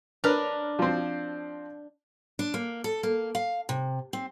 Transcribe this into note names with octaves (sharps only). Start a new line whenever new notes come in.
D4 A#4 B4 F6
F3 C4
D4
A#3
A4
A#3
F5
C3
C4